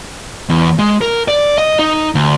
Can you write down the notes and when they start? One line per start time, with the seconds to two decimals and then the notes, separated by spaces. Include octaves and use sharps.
0.49 E2
0.79 G#3
1.01 A#4
1.28 D5
1.58 D#5
1.79 D#4
2.15 D2